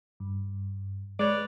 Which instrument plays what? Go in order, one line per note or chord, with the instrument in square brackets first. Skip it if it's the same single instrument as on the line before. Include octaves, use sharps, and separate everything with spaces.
[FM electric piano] G2
[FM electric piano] G#3 [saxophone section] B4 C#5 D5